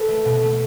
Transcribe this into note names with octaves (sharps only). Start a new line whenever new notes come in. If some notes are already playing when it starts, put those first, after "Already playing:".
Already playing: A4 B4
A3
B2
A3